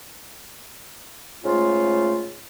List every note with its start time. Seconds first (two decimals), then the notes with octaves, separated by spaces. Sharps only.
1.43 G#2 C#3 A3 F4